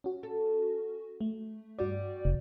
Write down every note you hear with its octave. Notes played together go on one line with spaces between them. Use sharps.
C#4 F#4
A4
A3
G2 G3 F#4 D5
F1